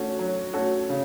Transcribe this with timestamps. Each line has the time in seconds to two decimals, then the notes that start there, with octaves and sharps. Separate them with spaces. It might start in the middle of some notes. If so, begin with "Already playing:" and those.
Already playing: A3 C#4 F#4
0.19 F#3
0.53 A3 C#4 F#4 A4
0.89 C#3